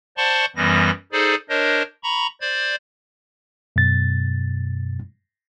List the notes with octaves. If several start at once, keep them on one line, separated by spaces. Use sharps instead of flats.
C5 D5 F#5 A5 C6 C#6
F#2 E3 G3 B3 A#6
D#4 G#4 A4 C5 D5
D4 A#4 C5 C#5 D#5
A#5 B5 C#6
C5 D5 G#6
F#2 B2 A6